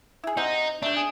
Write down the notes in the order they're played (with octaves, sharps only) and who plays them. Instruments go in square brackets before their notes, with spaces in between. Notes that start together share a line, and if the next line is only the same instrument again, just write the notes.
[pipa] E4 G#4
[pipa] C4 G4 F#5 [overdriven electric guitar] D#4
[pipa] G3 A3 [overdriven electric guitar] D4
[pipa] G#4